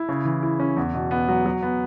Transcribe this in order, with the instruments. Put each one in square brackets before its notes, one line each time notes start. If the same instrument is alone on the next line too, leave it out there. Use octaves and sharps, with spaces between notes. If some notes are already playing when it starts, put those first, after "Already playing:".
Already playing: [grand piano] E4
C#3
E3
E4
C#4
E2
B2
B3
F#3
F#3
B3